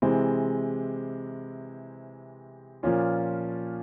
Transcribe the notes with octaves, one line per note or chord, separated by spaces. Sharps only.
C3 E3 G#3 C4
A#2 F3 A#3 C#4 F4